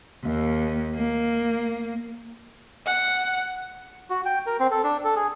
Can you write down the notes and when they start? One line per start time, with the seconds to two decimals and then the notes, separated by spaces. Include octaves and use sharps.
0.24 D#2
0.95 A#3
2.86 F#5
4.10 F#4
4.25 G5
4.46 A#4
4.60 C4
4.71 A4
4.84 D4
5.04 A4
5.16 G#4